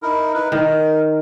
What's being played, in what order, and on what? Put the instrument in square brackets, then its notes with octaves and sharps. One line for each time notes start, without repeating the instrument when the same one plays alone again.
[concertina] D#4 E4 A#4
D#4 E4 B4
[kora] D#3 [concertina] A#4